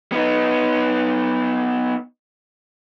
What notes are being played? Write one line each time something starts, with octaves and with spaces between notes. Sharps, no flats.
B3 D#4